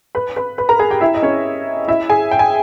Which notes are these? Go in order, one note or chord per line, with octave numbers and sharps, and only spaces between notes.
B4 B5
B4 B5
B4 B5
A#4 A#5
G#4 G#5
G4 G5
E4 E5
D#5
C#4 C#5
E4 E5
G#4 G#5
G5
G#5